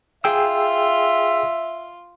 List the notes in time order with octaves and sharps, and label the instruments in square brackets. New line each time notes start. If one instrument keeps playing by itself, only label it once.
[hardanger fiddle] F4 [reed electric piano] G#4 G5 E6 [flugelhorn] E5